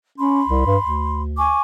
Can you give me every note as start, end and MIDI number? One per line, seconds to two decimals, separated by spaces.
0.18 0.43 61
0.18 1.22 83
0.18 1.22 84
0.48 0.63 36
0.66 0.77 43
0.82 1.54 38
1.37 1.61 80
1.37 1.61 85
1.37 1.61 86